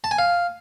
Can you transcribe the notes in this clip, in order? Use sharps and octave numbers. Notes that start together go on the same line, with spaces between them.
A5
G#5
F5